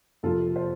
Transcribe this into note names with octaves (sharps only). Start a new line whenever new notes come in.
F2 C3 F3 A#3 F4 A4
C5